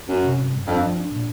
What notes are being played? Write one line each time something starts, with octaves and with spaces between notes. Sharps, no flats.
F#2 C#4
C3
G2
G2
F2 D4
F3
D4
A#2